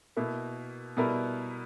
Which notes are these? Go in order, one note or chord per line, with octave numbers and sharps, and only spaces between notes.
B2 A#3 E4
B2 G3 B3 E4 A#4